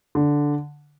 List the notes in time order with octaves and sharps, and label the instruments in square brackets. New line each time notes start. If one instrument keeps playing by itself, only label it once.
[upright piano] D3